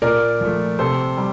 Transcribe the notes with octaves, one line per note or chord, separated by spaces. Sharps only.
A#2 A#4 D5
F3 A3
C3 A4 C5
G3